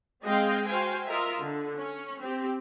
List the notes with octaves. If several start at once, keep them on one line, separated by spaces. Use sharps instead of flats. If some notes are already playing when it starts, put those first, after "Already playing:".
G#3 C4 G#4 D#5 F5 G5
F#4 C5 F5 G5 G#5
F4 A#4 D#5 E5
D3
C#4
C4 G4